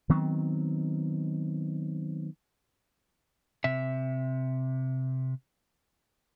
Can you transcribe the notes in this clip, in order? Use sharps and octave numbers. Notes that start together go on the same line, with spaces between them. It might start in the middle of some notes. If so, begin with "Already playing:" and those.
D#3 F#3 B3 C4
C3 E5